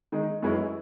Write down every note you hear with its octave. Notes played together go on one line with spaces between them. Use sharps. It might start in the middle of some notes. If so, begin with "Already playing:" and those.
D#3 G#3 D#4
F#2 E3 G#3 C#4 E4